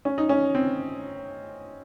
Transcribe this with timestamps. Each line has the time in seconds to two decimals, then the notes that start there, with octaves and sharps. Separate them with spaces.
0.05 C#4
0.18 D#4
0.29 C#4
0.55 C4